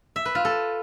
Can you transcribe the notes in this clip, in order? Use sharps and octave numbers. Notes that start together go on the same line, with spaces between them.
E5
B4
F4
A4